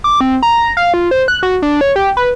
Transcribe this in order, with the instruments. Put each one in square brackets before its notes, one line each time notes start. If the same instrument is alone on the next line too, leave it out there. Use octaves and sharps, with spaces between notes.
[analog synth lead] D6
C4
A#5
F5
F4
C5
F#6
F#4
D4
C#5
G4
B4